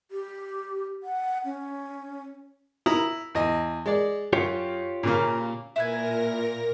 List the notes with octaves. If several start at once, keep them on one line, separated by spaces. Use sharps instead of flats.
G4
F#5
C#4
E4 A#5 D#6
E2 D#5
G#3 D5
F#2 F4 G4 C#5
A#2 C#3 A#3
A#2 E4 A#4 B4 G#5 A#6